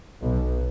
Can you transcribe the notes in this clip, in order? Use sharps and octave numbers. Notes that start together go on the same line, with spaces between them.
B1 B2